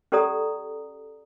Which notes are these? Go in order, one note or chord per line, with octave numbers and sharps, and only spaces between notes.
C#4 G4 A4 D5 A#5 D#6